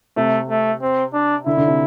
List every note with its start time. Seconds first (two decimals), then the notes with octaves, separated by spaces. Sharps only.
0.17 C3 A3
0.50 A3
0.82 C4
1.13 D4
1.46 D3 E4
1.57 D3
1.68 C3